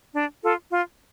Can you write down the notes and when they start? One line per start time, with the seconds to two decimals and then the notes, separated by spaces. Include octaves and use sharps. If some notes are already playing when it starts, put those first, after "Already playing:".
0.13 D4
0.41 F4 A4
0.71 F4